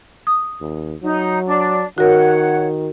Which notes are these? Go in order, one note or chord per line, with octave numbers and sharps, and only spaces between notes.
D#6
D#2
F#3 D#4
D4
D#3 F#4 A#4 C#5 F#5